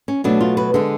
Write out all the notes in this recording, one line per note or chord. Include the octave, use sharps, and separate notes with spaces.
C#4
B2 F#3 A3 D4
F4
B4
D3 G#3 A4